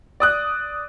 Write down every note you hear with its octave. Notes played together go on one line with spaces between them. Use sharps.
D5 D#6 F#6